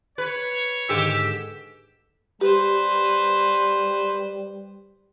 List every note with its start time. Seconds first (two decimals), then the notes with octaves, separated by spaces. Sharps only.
0.18 B4 C#5
0.89 G#2 D3 D#3 G4 E6
2.41 G3 G4 B4 C5